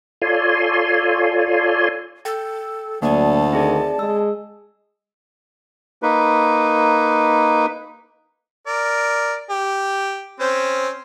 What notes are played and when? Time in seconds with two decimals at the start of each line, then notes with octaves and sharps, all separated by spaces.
0.22 F4 A4 C#5 D5 G#5 C6
2.25 A4 G5
3.02 D2 F#3 A#3 D5 A5
3.53 D#3 C4 G#4 D5
3.99 G#3 E6
6.03 A#3 D#4 B4
8.67 A#4 D5
9.50 G4
10.40 C4 C#4 C5